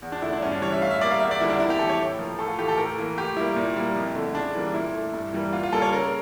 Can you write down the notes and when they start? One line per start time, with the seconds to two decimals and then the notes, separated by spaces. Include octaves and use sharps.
0.02 E2
0.12 D4
0.22 D3 A3 E4
0.33 D4
0.42 G2 C#4
0.51 D4
0.61 E3 G3 C#5
0.72 E5
0.82 A2 F5
0.91 E5
1.00 G3 A#3 D5
1.11 F5
1.20 E2 E5
1.31 D5
1.40 D3 G3 A#3 E4
1.50 D4
1.60 F2 E4
1.70 G4
1.79 E3 A3 A4
1.89 C#5
2.00 A2
2.19 F3 A#3
2.39 A2 A4
2.48 F4
2.58 E3 A3 G4
2.68 A4
2.77 A2 A#4
2.98 E3 A#3
3.18 A2 G4
3.36 G3 A#3 E4
3.56 A#2
3.76 G3 A#3
3.96 F2
4.15 D3 A3
4.35 C#3 D4
4.55 E3 G3 A#3
4.74 A#2 E4
4.93 A3
5.14 G2
5.33 E3 G3 A#3
5.53 A#2 F4
5.63 F4
5.73 G3 A#3 A4
5.82 C#5
5.92 C#3 A#4